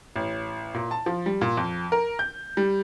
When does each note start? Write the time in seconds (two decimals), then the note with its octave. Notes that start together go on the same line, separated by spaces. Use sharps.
0.16 A1
0.74 A#2
0.91 A5
1.06 F3
1.26 G3
1.41 A#2
1.57 F2
1.92 A#4
2.19 G6
2.57 G3